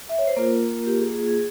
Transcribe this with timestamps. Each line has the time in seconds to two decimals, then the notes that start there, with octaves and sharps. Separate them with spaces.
0.09 E5
0.18 C#5
0.27 C5
0.37 A#3 F4 A#4
0.86 G4
0.98 G#4
1.13 G#4
1.28 G#4